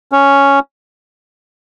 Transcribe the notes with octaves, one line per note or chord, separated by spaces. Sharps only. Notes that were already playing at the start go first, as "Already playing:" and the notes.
C#4